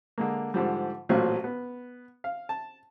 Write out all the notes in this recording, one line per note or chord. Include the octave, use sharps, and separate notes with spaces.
D3 G#3 A#3
G#2 D3 F3 G3
A1 A#2 F#3 A3 C4 F5
B3
F5
A5